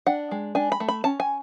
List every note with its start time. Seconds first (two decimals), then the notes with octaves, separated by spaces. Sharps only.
0.07 D4 F#5
0.31 G#3
0.55 D4 G#5
0.72 B5
0.80 A3
0.88 B5
1.04 C#4 A5
1.20 G#5